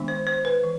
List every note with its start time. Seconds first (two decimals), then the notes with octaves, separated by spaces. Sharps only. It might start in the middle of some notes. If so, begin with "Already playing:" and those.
Already playing: D#3 G#3 B3 D4
0.08 C5
0.27 C5
0.45 B4
0.63 E3